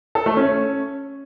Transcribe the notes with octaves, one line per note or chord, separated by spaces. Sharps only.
A4
A3
C#4